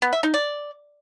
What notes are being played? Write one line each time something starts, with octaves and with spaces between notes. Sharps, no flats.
B3
E5
D#4
D5